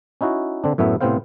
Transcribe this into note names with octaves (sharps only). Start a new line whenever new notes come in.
C#4 D#4 E4 F#4
D3 C4 D4
F#2 A2 A3 B3 E5
A2 C3 B3 C4 C5 F5